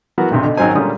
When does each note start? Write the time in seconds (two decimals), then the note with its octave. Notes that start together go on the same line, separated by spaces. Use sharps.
0.18 E3 F#3 B3 F#4 A#4
0.31 B1 G2 C3
0.43 B2 D3
0.57 G#1 D#3 F#3 C#4 C5 G#5
0.75 A#2 D3 G3 G#3 C#4 D#6